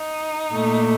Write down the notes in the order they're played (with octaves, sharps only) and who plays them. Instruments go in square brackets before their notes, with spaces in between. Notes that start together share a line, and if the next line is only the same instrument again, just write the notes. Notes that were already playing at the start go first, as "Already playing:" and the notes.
Already playing: [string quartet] D#4
A#2 A3